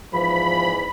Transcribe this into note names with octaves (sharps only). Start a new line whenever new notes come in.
E2 G#2 E3 F3 B5